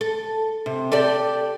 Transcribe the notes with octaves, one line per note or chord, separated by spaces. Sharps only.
A4
C3
G4 A4 D5